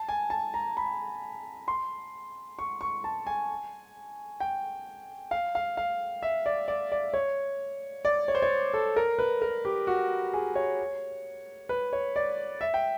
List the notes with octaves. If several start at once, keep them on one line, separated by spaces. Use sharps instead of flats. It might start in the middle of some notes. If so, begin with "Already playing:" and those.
Already playing: A5
G#5
A5
A#5
B5
C6
C#6
C#6
A5
G#5
G5
F5
F5
F5
E5
D5
D5
D5
C#5
D5
C#5
C5
C#5
A4
A#4
B4
A#4
G4
F#4
G#4
C#5
B4
C#5
D5
E5
G5